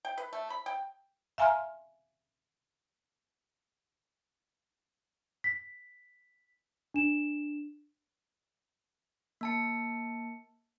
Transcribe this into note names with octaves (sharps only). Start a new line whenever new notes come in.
G5
B4
A3
B5
G5
E5 F5 G#5 A#5 C6 F6
B6
D4 E7
A#3 A5 C#7